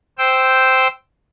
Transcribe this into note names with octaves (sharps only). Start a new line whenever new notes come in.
C5 G5 E6